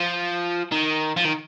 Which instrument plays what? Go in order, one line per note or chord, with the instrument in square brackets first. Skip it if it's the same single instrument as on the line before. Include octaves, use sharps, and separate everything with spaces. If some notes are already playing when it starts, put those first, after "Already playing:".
Already playing: [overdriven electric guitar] F3
D#3
F3
D#3